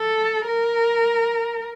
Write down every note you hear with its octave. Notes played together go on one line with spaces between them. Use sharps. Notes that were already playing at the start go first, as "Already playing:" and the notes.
Already playing: A4
A#4